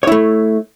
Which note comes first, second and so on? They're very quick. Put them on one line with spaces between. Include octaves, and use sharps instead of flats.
C#5 E4 A3